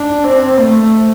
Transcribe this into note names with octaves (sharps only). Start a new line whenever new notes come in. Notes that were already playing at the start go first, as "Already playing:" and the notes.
Already playing: D4
C4
A3